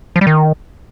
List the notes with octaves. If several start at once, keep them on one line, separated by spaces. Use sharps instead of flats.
F3
G3
D#3